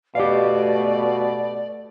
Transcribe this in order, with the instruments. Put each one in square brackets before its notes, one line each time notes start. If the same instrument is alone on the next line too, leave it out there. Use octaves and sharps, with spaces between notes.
[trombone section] B2 [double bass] A3 [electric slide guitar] G4 F5 [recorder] D5